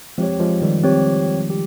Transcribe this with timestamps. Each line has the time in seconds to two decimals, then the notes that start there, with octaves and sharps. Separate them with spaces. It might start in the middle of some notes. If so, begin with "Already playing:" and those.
0.18 F3 G#3 C4 G4 C#5
0.39 F3 G#3
0.62 D#3 G3
0.84 C4 G4 C#5
1.50 G4